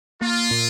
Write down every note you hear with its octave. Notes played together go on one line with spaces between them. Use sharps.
A#3 F4
A#2